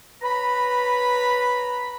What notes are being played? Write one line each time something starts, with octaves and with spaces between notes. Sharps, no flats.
B4 C#5 A#5 B5